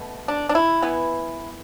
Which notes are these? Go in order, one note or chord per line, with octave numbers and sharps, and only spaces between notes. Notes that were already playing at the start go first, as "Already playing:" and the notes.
Already playing: B2 A3
D4
D4
E4
E3 B3